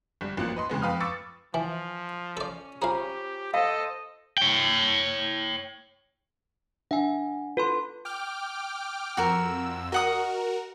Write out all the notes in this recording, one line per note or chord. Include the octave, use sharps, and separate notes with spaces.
G1 G3
A1 F3 A#3 F#6
B4 D#5 C6
F2 C#3 G#3 B3
F2 B4 F5 B5 D#6 F6
B5 C#6 D6 E6 A6 C#7
E3 F3 G#5
C#4 A4 D5
F4 G4 G#4 C5 F5 A#5
A4 C5 D#5 F5
C#5 G5
D4 E5 F#5 G#5
F4 A4 B4 C6
G5 D6 F6
F2 F#4 A#4 E6
F#4 A#4 D#5 F#5 D#6